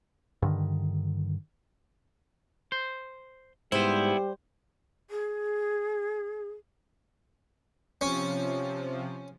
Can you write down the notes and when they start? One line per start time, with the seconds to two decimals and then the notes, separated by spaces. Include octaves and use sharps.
0.42 G2 D3 D#3
2.72 C5
3.72 G#2 G3 B3 E4 G4 C5
5.10 G#4
8.01 C3 F3 C#4